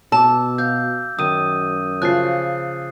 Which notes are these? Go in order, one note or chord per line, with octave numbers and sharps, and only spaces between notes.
B2 A5 D6 E6
F5 G6
F#2 D#3 D#6 D#7
C#3 F3 G#5 F#6 A6 C7